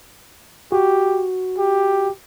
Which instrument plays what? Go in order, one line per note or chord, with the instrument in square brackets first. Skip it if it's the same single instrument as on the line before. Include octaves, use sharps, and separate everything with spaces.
[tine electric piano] F#4 [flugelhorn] G4
[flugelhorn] G4